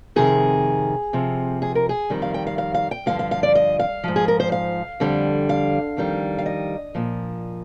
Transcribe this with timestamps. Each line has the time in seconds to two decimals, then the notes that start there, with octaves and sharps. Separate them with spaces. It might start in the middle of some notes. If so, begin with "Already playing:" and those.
0.16 F2 C3 D#3 G#4
1.13 F2 C3 F3
1.62 G#4
1.75 A#4
1.89 G#4
2.10 F2 D#3 G3
2.22 F5
2.34 G5
2.47 F5
2.58 F5
2.74 F5
2.91 G5
3.06 G2 D3 F3 F5
3.19 F5
3.31 F5
3.43 D5
3.55 D#5
3.79 F5
4.04 G#2 F3
4.16 G#4
4.28 A#4
4.40 C5
4.52 F5
5.00 F2 D3 G3
5.49 F5
5.97 F2 D#3 G3
6.38 F5
6.46 D#5
6.95 A#2 F3